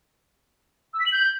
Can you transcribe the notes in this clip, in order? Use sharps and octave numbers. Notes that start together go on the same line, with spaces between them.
E6
B6
F#7
G6